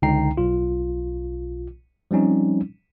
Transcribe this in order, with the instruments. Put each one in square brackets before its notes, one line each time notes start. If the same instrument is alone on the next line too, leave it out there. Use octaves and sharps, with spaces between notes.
[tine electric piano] C#2 D3 D#4 G5 A#5 C7
B1 F4
F3 G3 C4 C#4 D#4